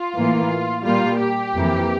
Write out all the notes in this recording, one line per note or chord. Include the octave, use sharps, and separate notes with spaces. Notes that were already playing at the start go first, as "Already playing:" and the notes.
Already playing: F4
A2 E3 A#3
A#2 G3 A#3 F4
G4
F2 E3 A#3